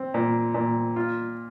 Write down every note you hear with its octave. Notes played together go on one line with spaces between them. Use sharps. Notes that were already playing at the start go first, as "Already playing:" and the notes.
Already playing: C4
A#2
A#2
F4